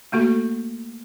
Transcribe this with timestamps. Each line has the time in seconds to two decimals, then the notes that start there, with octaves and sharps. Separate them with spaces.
0.12 A3 A#3 F#4 A4